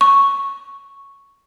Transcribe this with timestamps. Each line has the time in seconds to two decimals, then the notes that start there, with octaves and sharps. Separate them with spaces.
0.01 C#6